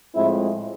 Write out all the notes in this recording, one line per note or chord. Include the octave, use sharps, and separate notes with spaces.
A2 F3 G#3 C4 E4